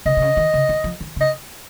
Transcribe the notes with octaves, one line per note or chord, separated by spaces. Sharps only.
C#3 D#5
C3
C#3
D#3
C#3
D#3
F3
D#3
C#3
D#5